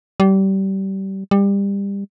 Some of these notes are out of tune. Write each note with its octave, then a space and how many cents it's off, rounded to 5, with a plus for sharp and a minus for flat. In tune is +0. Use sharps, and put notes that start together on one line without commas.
G3 -25
G3 +25